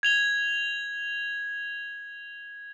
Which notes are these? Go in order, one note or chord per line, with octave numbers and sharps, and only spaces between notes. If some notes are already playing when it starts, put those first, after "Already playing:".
G#6 F7 G7